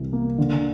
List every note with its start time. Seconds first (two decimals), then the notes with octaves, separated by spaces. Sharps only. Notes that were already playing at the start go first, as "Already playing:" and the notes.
Already playing: C2 C3 E3
0.13 A#3
0.38 D3